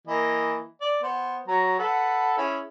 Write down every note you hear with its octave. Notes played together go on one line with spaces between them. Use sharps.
E3 A#3 D#5
D5
B3 C5
F#3 C#5 A#5
A4 B4 F#5
C#4 E4 G#4